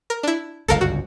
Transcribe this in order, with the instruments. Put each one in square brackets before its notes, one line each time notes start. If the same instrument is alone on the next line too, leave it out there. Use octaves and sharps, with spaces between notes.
[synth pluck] A#4
D4 E4
[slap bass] G1 C#2 F#2 [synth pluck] A4 A#4 F5
[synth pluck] F#4